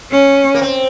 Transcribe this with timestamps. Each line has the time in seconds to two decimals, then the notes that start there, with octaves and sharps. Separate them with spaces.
0.12 C#4
0.55 A#3
0.62 C4